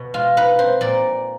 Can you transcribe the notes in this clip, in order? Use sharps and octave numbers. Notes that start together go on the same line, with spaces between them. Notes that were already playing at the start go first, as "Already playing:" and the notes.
Already playing: B2
G#3 F4
D#4 B4
C4 C5
A#2 D5